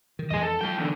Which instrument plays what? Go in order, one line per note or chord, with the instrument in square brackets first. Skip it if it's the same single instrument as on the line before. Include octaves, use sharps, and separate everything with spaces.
[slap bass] D#3
[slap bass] F2 E3 G#3 [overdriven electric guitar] G#4 D#5
[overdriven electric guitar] A4
[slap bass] F#3 G#3 [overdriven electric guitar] F4 G5
[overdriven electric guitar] E2 D3